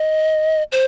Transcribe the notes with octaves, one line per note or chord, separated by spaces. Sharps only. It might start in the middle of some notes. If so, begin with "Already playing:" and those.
Already playing: D#5
C5